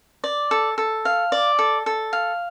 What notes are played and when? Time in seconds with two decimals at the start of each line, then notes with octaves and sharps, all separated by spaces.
0.24 D5
0.51 A4
0.78 A4
1.05 F5
1.32 D5
1.59 A4
1.86 A4
2.13 F5